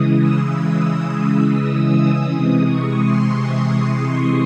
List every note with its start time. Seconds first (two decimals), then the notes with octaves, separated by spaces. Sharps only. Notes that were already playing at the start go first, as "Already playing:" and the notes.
Already playing: C#3 E3 G#3 D#6
0.20 E6
2.32 C3 E3 G#3 D#6
2.68 C#6
3.04 C6
3.39 D#6